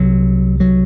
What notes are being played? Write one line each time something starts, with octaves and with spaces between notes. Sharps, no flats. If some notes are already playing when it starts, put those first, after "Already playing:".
Already playing: C2 C3 F#3
F#3